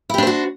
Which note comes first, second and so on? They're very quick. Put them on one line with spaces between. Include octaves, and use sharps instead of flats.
E4 G4 D4 C5 F#4